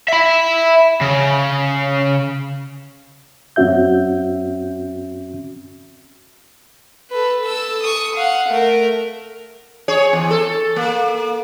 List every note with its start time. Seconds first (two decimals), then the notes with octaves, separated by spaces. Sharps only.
0.08 E5 B5
1.01 C#3
3.56 F#2 C4 C#4 F#4 E5 G6
7.10 A4 B4
7.44 A4 E6
7.82 C#6 D#6
8.15 F5 F#5
8.48 A3 A#4
9.88 G#4 C#5
10.13 E2
10.31 A4
10.76 A#3